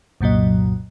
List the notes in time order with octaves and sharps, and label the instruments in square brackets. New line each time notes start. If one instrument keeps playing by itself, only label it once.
[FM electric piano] C2 F#2 A#2 F#3 D#5